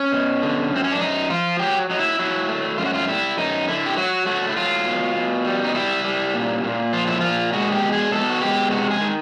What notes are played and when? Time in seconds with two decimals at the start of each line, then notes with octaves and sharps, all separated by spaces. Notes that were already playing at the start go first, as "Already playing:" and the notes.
Already playing: C#4
0.12 B2
0.42 D3
0.72 F#2 C4
0.84 C#4
0.92 D4
1.00 F#2 D#4
1.30 F3 F4
1.59 F#3 G4
1.90 F#3 D#4
1.99 E4
2.19 F#3 E4
2.49 A3
2.78 F#2 F4
2.86 F#4
2.94 F4
3.08 G3 E4
3.38 F#2 D#4
3.67 D3 E4
3.86 G4
3.97 F#3 F#4
4.26 A3 F#4
4.49 E4
4.56 F#3 F4
4.86 B2
5.15 B2
5.45 G3
5.64 D#4
5.75 G3 E4
6.04 G3
6.34 A#2
6.64 A#2
6.93 F3 F4
7.07 E4
7.21 A#2 F4
7.53 G#3 F#4
7.72 G4
7.82 B2
7.92 G#4
8.12 B2 A4
8.30 F#4
8.41 G#3 G4
8.71 C3 F#4
8.90 G#4
9.01 D#3